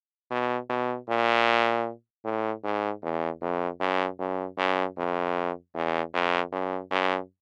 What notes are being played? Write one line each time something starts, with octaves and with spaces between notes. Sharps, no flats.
B2
B2
A#2
A2
G#2
E2
F2
F#2
F#2
F#2
F2
E2
F2
F#2
F#2